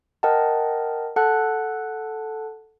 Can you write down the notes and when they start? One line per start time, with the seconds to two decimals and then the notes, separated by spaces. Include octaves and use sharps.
0.23 A#4 D#5 F#5 G5 A5
1.16 A4 F#5 A5 F#6